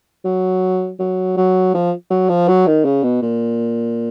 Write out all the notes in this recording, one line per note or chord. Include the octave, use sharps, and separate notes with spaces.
F#3
F#3
F#3
F3
F#3
F3
F#3
D#3
C#3
B2
A#2